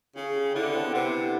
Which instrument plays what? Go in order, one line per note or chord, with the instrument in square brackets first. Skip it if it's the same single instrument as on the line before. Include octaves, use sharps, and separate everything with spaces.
[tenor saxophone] C#3 [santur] G#4
[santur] G4
[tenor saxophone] D3 [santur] E4
[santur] D4
C4
B3
[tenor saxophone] C3